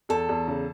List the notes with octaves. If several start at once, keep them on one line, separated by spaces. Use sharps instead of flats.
E2 A4
E2
C#3